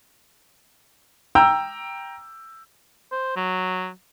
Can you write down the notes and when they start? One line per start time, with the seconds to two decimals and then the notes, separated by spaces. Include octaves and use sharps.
1.35 G5 A#5 E6 G6
3.12 C5
3.36 F#3